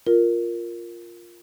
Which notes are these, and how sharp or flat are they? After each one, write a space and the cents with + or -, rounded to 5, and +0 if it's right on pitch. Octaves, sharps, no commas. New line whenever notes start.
F4 +0 A#4 +0